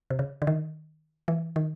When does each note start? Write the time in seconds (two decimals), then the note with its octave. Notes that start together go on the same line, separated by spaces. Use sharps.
0.10 C3
0.19 C#3
0.42 D3
0.47 D#3
1.28 E3
1.56 D#3